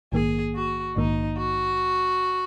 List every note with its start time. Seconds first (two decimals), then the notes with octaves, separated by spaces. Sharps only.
0.12 A#1 G#2 D#3 A#3 G#4
0.55 F#4
0.96 A#1 G#2 D#3 A#3 D#4
1.38 F#4